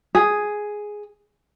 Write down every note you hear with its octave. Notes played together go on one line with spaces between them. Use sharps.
G#4